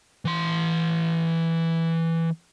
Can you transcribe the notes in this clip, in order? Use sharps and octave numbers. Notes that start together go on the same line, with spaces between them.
E3 C6